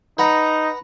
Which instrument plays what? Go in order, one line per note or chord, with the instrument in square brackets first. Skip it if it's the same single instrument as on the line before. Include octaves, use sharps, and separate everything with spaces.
[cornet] D#4 [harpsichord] B4 F#5 A#5